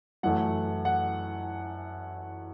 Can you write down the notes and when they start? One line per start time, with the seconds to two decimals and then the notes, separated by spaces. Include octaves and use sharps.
0.23 F#2 E3 A3 F#5
0.85 F#5